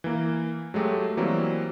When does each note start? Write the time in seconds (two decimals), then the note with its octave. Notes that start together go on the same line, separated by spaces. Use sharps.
0.04 E3 A#3
0.74 F#3 G#3 A3 G4
1.17 E3 F#3 G3 A#3 C4